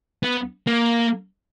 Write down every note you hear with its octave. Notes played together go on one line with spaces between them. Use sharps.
B3
A#3